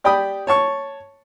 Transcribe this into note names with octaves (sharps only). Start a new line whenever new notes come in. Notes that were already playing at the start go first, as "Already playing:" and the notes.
G4 D5 G5 B5 D#6
C#5 A5 C#6